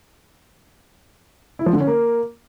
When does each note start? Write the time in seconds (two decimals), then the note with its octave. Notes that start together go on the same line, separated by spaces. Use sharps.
1.59 E4
1.66 F3
1.73 D3
1.80 C#4
1.87 A#3